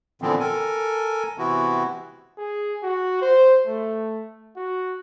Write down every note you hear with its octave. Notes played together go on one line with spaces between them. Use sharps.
A#2 D3 E3 F3 B3 C4
A4 A#4 G#5
C3 E3 B3 E4 F#4
G#4
F#4
C5
A3
F#4